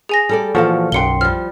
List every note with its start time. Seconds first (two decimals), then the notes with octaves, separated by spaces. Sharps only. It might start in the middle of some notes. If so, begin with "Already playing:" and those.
0.09 G#4 G#5 A#6
0.29 G3 A4 D5
0.55 A#2 E3 F3 F#4 A4 F5
0.92 B1 F#2 G5 C6 C#7 G7
1.21 F3 G3 F6